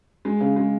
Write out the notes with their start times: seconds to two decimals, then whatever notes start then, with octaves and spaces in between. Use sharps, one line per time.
0.25 G#3
0.41 C#3
0.56 G#3